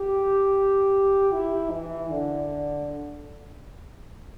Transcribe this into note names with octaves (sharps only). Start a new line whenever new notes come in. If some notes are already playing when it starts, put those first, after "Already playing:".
Already playing: G4
E4
E3
D3